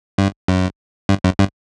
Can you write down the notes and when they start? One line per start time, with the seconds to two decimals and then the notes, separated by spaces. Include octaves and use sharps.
0.18 G2
0.48 F#2
1.09 G2
1.24 F#2
1.39 G2